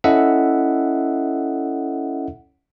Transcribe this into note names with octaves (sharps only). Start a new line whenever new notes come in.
C#4 E4 A4 D#5 E5 F#5